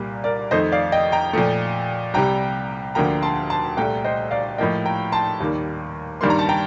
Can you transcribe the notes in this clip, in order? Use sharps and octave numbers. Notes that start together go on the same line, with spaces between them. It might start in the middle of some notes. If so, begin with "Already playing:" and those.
Already playing: C2 A#2 G3 A#3
A#4 D5
F2 D#3 A3 C5 D#5
D5 F5
D#5 G5
G5 A#5
A#2 F3 A3
C2 C3 G3 G5 A#5
D2 D3 F3 A#3 G5 A#5
A5 C6
A5 C6
C2 A#2 A3 G5 A#5
C5 D#5
D5 F5
A2 F3 A#3 D#5 G5
G5 A#5
A5 C6
D#2 D#3 G3 A#3
G2 D#3 G3 A#3 C6
A#5
A5
G5 A#5